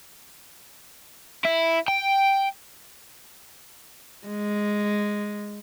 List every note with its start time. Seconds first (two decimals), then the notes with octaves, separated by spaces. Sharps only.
1.45 E4
1.88 G5
4.27 G#3